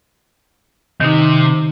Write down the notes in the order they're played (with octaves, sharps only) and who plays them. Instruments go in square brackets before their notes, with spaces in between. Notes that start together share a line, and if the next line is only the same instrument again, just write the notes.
[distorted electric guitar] C3 [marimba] D#3 D#4